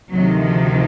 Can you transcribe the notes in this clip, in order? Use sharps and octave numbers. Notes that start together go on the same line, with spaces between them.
D2 C3 D#3 F#3
F3